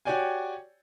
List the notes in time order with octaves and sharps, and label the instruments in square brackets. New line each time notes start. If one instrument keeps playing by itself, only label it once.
[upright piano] F#4 G4 C#5 D5 G5 G#5